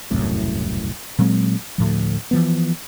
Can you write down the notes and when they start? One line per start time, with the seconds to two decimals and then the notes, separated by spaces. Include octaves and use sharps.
0.11 E1 C2 F#2 A2
1.19 A#2 F#3 G#3 C4
1.78 D2 A2 F3
2.31 E3 F3 B3